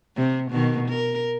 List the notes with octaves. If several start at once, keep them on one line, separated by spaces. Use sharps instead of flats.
C3
B2 D#3
A#4